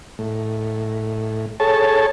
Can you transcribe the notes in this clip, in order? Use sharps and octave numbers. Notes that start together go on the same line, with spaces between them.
A2
G#4 A4 C#5 A5